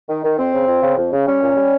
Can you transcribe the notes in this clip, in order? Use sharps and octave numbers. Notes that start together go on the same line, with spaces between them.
D#3
D#3
F2 C4
C#3
F2
C#3
F2
C#3
G3 C#4
A#2
G3